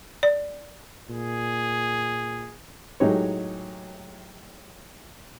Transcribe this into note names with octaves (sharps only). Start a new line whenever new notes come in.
D5
A#2 G#4
A2 F#3 G#3 D#4 G4 C#5